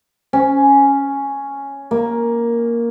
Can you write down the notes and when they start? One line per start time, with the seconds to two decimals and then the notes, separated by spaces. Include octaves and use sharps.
0.33 C#4
1.91 A#3